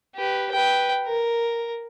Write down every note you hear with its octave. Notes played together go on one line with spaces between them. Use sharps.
G4 B4
B4 G5
A#4